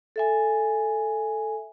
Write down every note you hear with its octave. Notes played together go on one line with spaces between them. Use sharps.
A4 E5 G#5